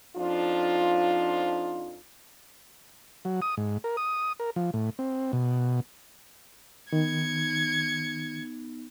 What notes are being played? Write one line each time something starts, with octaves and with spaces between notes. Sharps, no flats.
F2 F3 D4 D#4 F4
F#3
D#6
G#2
A#4
D#6
A#4
F3
A2
C4
B2
D#3 B3 D#4 G#6 C#7